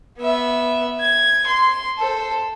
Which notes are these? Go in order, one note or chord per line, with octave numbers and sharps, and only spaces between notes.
B3 E5
G#6
C6
A4 C5